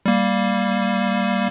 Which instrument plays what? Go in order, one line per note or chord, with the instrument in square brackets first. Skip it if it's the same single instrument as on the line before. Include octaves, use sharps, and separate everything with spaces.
[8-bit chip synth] G3 A#3